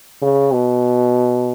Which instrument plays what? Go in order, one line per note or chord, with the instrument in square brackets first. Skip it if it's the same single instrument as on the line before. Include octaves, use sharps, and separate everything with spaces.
[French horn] C#3
B2